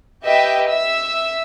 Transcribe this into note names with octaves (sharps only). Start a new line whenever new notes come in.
G4 B4 D#5 E5 G5
E5 E6